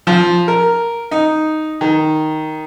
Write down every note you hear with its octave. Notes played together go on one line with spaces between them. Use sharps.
F3
A#4
D#4
D#3